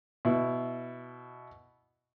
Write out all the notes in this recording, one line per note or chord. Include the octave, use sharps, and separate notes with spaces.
B2 E4